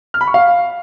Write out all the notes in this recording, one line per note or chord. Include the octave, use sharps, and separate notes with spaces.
F6
B5
C#6
F5